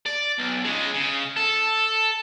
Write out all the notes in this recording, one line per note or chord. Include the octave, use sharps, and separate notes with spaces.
D5
B1
C#3 G#3
C#3
A4